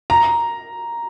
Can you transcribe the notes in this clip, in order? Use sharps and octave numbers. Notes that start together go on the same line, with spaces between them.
A#5